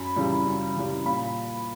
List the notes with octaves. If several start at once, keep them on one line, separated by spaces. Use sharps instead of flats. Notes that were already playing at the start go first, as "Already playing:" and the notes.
Already playing: F#2 B5
C#3 E3 G3
F#2
C#3 E3 G3
A#2 B5